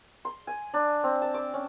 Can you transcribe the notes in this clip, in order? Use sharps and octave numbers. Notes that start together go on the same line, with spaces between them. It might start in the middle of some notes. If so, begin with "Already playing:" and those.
C6
G#5
D4
C4
A5
D6
C#4